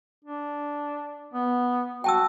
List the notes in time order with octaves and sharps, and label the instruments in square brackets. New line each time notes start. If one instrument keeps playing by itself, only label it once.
[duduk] D4
B3
[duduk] F#4 [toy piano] G5 A5 E6